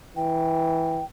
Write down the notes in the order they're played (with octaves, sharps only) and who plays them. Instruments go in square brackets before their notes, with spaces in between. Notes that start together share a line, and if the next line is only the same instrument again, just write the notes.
[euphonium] E3 [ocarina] G5